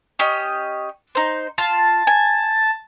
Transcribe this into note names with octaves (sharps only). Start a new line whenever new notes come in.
C#4 G4 D#5
D#4 C5
F4 A5
G#5